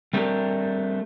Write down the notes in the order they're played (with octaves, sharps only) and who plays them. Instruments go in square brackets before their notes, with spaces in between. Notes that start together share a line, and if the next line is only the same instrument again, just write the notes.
[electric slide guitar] G3 A3 C4 D4 G4 A#4